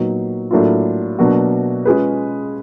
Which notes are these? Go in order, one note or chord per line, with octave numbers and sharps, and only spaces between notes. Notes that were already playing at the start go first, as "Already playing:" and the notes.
Already playing: A#2 F#3 B3 D#4
A2 F#3 A#3 D4 F4
B2 F#3 A#3 D4 F#4
G#3 C#4 F4 G#4 B4